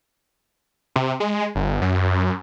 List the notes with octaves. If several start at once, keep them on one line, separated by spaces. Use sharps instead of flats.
C3
G#3
G1
F#2